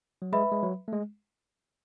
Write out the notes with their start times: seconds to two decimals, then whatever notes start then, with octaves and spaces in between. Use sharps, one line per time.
0.22 F#3
0.33 G#3 B4 E5 B5
0.52 G#3
0.63 F#3
0.88 A3
0.93 G#3